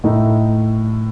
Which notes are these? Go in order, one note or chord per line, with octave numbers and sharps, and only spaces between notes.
A2 A3 D#4